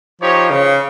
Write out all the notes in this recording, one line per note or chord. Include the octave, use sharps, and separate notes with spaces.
F3 D#4 G4 C#5
C#3